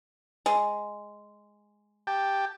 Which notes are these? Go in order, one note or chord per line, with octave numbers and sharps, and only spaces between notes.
G#3
G4 G5 A5